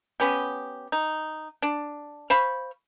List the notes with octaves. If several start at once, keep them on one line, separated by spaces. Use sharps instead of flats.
B3 C#4 G4
D#4
D4
C5 F5 B5 C#6